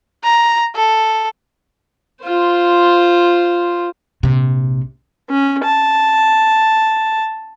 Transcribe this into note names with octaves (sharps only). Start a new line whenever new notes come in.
A#5
A4
F4 C5
A#1 C3
C#4
A5